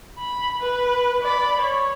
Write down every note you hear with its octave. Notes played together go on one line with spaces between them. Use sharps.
B5
B4
D5 B5
C#5